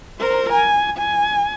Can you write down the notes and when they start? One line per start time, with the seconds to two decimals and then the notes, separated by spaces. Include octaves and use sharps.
0.20 A#4 C5
0.53 G#5
0.98 G#5